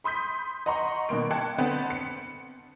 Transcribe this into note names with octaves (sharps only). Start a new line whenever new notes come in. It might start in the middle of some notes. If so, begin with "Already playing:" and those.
B5 C6 D#6 G6 B6
D#5 F#5 A#5 C6 C#6
B2 D#3 A#3 D7
G5 A5 F#6 G#6 C#7
D3 B3 C4
C#7